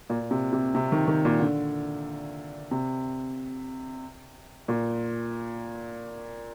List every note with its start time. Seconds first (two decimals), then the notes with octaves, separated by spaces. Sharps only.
0.10 A#2
0.31 C3
0.53 C3
0.75 C3
0.92 D#3
1.07 D#3
1.25 A#2
1.40 D3
2.71 C3
4.68 A#2